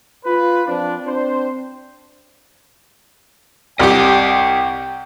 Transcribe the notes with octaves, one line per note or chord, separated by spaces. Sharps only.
F4 B4
F3 C4 D4
C4 D4 C5
C2 G4 D#5 F#5 G5